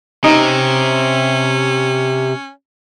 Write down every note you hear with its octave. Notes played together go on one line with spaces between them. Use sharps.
C3 C#4 D#4